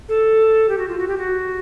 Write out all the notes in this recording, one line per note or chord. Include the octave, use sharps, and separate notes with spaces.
A4
G4
F#4
F4
F#4
G4
F#4